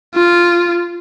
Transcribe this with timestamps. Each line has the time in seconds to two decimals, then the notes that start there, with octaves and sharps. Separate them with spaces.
0.14 F4